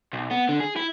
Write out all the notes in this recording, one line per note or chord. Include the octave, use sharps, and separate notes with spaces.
B1
B3
D3
G#4
E4